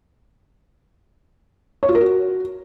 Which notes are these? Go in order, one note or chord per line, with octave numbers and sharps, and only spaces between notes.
C#5
F4
A#4
F#4